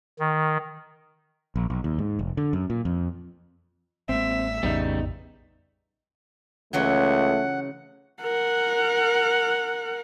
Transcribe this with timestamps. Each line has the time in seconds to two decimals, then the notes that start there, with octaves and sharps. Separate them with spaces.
0.19 D#3
1.56 A#1
1.70 B1
1.84 D#2
1.98 G#2
2.19 F1
2.37 D3
2.53 F#2
2.70 A#2
2.85 F2
4.09 A1 G#3 A#3 C4 E5
4.63 A#1 F2 A2 C#3 G3 B3 D#4
6.73 C#2 C#3 E3 F#3 A3 F#5
8.22 A#4 F#5